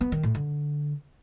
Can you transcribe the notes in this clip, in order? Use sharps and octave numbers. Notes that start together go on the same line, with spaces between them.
B3
D#3
A2
D3